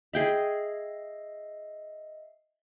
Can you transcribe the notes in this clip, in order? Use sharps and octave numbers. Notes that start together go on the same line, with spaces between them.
G#4 D#5 E5 G5 B5 C7